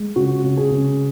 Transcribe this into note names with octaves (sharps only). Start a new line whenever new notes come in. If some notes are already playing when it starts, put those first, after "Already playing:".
Already playing: G#3
C#3 F#4
C#3
G#4
C#3